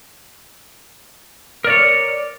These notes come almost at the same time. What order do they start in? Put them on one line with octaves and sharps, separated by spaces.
A#4 D5 C#5